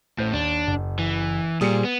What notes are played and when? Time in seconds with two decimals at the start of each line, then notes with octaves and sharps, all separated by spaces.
0.19 A1 A2 C5 G6
0.33 D#2 D4
0.67 F#1
0.99 E3
1.61 A#2 G3 G#4 C5 D#6 C#7
1.84 B3